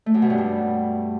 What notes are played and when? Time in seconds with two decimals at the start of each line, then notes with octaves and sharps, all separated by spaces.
0.06 A3
0.14 F#2
0.22 B2
0.30 G2
0.38 G3